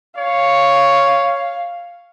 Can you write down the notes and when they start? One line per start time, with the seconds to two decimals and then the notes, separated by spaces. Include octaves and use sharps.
0.17 C#5 F5